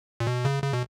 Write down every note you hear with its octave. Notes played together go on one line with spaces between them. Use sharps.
A#2
B2
C#3
C#3
B2